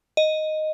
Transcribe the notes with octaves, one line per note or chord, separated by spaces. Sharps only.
D#5